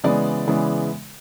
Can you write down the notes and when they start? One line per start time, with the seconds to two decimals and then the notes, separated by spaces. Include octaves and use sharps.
0.03 C#3 E3 G#3 B3 D5
0.47 C#3 E3 G#3 B3